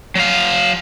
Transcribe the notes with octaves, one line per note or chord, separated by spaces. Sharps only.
F#3 F5